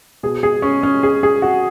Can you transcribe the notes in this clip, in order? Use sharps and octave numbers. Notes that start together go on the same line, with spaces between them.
B2 G#4
G#4
C#4
C#4
G#4
G#4
F#4